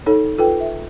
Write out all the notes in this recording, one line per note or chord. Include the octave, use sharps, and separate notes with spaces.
D#4 A4 C#5
F4 A4 B4 G5
E5